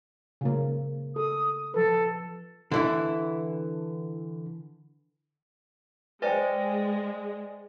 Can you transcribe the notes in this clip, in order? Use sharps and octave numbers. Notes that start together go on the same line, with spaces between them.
C#3 A#3
A4 D#6
F3 A4 B4
D3 E3 E4
G#3 B4 C5 D5 D#5 G5 G#5